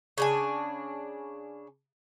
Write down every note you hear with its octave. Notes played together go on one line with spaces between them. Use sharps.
C#3 D4 G#5